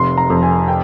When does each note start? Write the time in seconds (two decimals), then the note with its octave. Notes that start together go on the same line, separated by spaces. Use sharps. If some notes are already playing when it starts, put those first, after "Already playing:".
Already playing: F1 C6
0.17 A#5
0.30 F2
0.43 G#5
0.68 G5